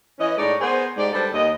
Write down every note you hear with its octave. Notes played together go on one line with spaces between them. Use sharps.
E3 C#4 D#5
A2 G#3 D#4 C#5 D5
B3 G#4 A#4 C5
G#2 G4 D5
G3 D4 A4 B4 C5 D5
D#2 D#5